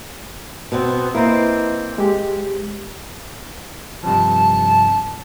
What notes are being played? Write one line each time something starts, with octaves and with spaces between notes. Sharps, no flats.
B2 B3 C4
A#3 C4 E4 B4 D#5
G#3 G4
G2 C3 F3 A5